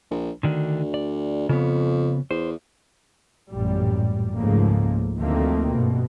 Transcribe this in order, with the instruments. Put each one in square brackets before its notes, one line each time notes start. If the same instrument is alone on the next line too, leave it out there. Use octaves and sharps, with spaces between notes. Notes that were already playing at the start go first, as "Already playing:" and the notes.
[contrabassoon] A#1
[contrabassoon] D2 [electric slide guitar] D3 D#3 D4
[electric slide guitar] D5
[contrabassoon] F2 [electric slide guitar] C#3 B3
[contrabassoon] E2 [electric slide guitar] C5
[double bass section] A1 F#2 A#2 G3
C#2 G#2 C#3 F3 A3 A#3
D2 D#3 F3 A3 A#3 C4
G2 B2